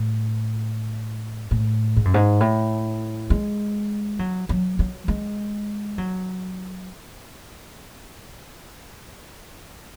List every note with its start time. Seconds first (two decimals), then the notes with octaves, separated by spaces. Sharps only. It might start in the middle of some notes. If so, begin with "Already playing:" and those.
Already playing: A2
1.51 A2
1.96 G#2
2.05 F#2
2.14 G#2
2.40 A2
3.30 G#3
4.19 F#3
4.49 F#3
4.79 F#3
5.08 G#3
5.98 F#3